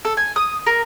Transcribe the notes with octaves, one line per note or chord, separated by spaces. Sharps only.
A4
G#5
D#6
A#4